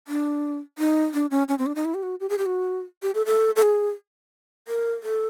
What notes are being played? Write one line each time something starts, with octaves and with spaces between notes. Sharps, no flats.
D4
D#4
D4
C#4
C#4
C4
D4
D#4
E4
G4
F#4
G4
G#4
G4
F#4
G4
A4
A4
A4
G#4
A#4
A4